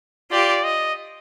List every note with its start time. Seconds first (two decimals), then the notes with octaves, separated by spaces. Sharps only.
0.31 F4 G4 D5
0.64 D#5